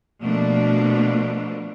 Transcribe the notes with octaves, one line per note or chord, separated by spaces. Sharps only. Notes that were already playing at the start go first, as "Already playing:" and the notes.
B2 F3 A3 A#3 D4